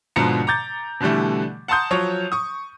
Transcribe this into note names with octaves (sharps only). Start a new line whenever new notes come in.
G#2 B2 D3 F3 A#5 C#7
A#5 D6 G6 A6
B2 D3 E3 G3 A3
F#5 A5 A#5 C6 D#6 G6
F3 F#3 C#5
C#6 D#6